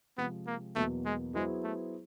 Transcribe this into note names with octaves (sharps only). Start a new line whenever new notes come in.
C3 F3 G#3 B3 C4
A#3
E2 B2 F#3 A3 A#3
G#3
F#3 G#3 B3 E4 G#4 C5
A3